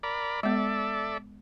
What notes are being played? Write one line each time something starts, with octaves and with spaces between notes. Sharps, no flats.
A#4 D5 B5
G#3 B3 A4 D5 E5